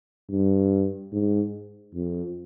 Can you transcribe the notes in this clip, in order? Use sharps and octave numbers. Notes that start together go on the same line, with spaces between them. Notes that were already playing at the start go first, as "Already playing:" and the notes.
G2
G#2
F2